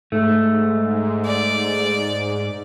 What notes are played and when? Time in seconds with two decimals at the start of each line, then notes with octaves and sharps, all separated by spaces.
0.12 G#2 A3
1.26 D5